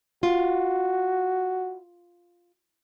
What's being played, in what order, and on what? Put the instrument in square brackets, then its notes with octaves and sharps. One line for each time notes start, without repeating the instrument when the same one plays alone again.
[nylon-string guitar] F4 [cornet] F#4